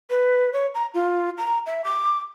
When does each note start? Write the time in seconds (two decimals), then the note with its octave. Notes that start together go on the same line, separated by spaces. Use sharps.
0.10 B4
0.53 C#5
0.75 A#5
0.94 F4
1.38 A#5
1.66 E5
1.84 D6